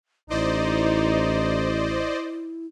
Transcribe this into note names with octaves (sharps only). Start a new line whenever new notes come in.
A1 D#4 E4 C5 D5 D#5